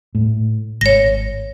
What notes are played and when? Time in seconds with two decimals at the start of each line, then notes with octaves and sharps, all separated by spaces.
0.15 A2
0.81 G#1 C#5 A#6